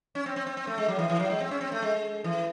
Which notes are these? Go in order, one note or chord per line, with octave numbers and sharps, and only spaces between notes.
C#4
C4
C4
C4
C4
A3
G#3
F#3
E3
E3
F#3
G#3
C4
C#4
C4
A3
G#3
E3